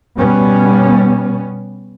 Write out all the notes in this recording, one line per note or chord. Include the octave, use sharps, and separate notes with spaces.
B2 G3 B3 C#4